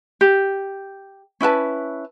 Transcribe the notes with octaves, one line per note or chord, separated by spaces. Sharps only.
G4
C#4 E4 B4 A5